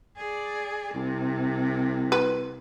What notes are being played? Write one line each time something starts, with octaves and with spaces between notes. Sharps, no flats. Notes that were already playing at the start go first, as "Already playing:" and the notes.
G#4 D5
C2 C3
B4